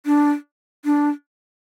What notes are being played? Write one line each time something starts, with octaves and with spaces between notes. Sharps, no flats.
D4
D4